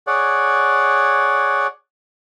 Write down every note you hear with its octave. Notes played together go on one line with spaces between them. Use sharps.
G#4 C#5 D5 F#5